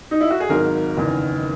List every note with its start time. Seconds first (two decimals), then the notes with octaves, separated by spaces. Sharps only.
0.11 D#4
0.21 E4
0.30 F#4
0.40 G#4
0.49 G#1 G#2 F#3 A#4
0.97 F#1 E2 D#3